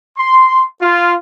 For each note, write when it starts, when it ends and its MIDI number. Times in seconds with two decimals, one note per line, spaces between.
0.17 0.64 84
0.81 1.14 65